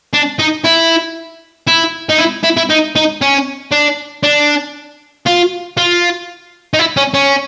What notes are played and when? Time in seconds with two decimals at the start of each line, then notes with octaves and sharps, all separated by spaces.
0.13 D4
0.39 D#4
0.64 E4
1.67 E4
2.09 D#4
2.18 E4
2.44 E4
2.57 E4
2.70 D#4
2.96 D#4
3.21 C#4
3.71 D4
4.23 D4
5.26 F4
5.77 F4
6.74 D#4
6.79 E4
6.97 C#4
7.14 C#4